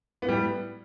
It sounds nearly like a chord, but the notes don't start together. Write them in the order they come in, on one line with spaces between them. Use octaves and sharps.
B3 A2 G3